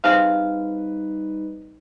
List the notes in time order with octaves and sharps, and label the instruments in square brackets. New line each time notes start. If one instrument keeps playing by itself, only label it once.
[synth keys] G3 D#4 B4 [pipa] C4 G#4 F5